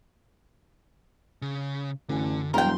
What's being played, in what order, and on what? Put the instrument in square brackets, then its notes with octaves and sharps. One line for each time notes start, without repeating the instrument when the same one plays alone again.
[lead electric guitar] C#3
[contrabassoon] A1 [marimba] F#2 G#5 [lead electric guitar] D3
[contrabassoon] E1 [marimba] F#3 G3 [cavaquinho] A#4 G5 [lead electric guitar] C6